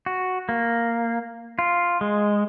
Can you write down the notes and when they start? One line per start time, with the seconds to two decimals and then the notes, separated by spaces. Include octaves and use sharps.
0.06 F#4
0.49 A#3
1.59 F4
2.01 G#3